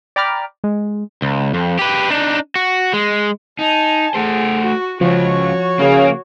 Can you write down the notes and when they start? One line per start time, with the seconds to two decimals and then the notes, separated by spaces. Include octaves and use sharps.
0.16 D5 G5 A#5 B5 D6 F6
0.64 G#3
1.22 C#2
1.54 F2
1.79 G4 B4
2.10 D4 D#4
2.55 F#4
2.93 G#3
3.59 D#4 G#5 A5
4.14 A3 G#4 C5
4.62 F#4
5.01 C#2 C#3 F3 F#4 C#5
5.79 C#3 A#3